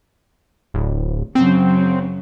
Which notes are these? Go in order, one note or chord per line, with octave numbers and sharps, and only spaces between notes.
D1
F#2 C#3 F#3 C4